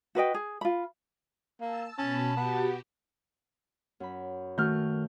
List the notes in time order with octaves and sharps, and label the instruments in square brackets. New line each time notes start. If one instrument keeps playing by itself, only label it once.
[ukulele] F#4 B4 D#5 G5
G#4
F4 B5
[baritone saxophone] A#3 [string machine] A5 E6
[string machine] B2 B5 [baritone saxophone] C#4 [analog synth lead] A5
[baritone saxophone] B3 [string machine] F#4 G4
[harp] F#2 B5
[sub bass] D#3 [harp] A3 [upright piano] F#4 F6 G6